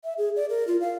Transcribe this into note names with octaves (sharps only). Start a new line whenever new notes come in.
E5
G#4
D5
A#4
F4
F5